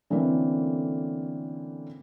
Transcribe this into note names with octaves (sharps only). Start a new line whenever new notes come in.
D3 E3 A3 A#3 C4 C#4